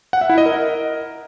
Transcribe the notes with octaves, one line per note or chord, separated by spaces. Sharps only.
F#5
E5
E4
D#5
A#4